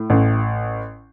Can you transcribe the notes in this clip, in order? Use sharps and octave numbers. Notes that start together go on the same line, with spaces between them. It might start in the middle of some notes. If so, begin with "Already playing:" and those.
Already playing: A2
A1